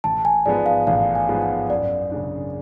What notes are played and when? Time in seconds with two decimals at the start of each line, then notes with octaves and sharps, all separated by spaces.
0.04 A1 A5
0.25 G#5
0.46 G#2 F3 G#3 B3 D5
0.66 F5
0.87 A1 F5
1.15 G#5
1.29 G#2 F3 G#3 B3
1.42 F#5
1.70 F#2 D5
2.11 C#3 G#3 D4